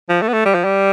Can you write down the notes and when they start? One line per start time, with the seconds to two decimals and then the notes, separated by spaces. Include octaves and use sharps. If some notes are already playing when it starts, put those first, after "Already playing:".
0.09 F3
0.22 A3
0.28 B3
0.33 A3
0.45 G3
0.54 F3
0.64 G3